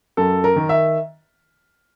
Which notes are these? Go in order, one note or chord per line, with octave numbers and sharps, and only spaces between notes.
F#2 A4
A#4
D#3
E5